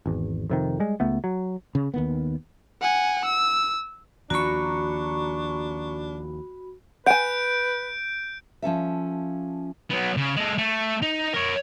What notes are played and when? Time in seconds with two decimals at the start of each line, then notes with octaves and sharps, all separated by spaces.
0.06 G#1 E2
0.49 F2 C3 D#3
0.80 G3 G#3
1.00 C#2 A3 B3
1.24 F#3
1.75 C#3
1.94 D#2 D#3 B3
2.82 F#5 G#5
3.25 E6
4.30 D#2 F3 D4 F#4 A#5 B5 C#6
7.06 B4 F#5 G#5 G6 D7
8.62 F3 C#4 A4 E5
9.91 F#3 B3
10.17 C#3
10.36 G#3 A4
10.58 A3
11.02 D#4
11.33 A#4 C#5